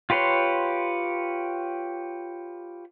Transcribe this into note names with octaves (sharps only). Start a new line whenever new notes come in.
F4 G4 B4 C#5 C6